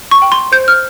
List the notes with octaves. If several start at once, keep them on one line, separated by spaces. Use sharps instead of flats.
C#6
G5
C6
C5 G6
F6